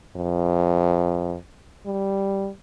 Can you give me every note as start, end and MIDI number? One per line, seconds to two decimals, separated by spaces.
0.16 1.36 41
1.86 2.50 55